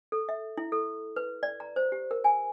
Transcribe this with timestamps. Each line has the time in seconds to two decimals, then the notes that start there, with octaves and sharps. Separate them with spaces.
0.12 A4
0.29 E5
0.57 E4
0.72 A4
1.16 B4
1.43 D5
1.60 A#5
1.76 C5
1.92 G4
2.11 A#4
2.24 G#5